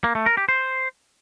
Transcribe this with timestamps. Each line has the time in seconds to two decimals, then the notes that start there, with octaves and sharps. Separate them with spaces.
0.04 A#3
0.15 A3
0.26 A#4
0.37 G4
0.49 C5